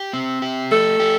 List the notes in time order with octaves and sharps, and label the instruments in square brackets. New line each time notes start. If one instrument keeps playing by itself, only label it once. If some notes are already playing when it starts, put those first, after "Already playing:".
Already playing: [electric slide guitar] G4
C4
G4
[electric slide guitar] A3 [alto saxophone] A4
[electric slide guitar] G4